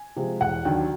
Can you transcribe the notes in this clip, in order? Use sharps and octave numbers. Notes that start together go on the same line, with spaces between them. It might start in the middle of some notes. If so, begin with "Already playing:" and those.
Already playing: G#5
C3 F3 G#3
E1 F#5
D#2 D3 F#3 G5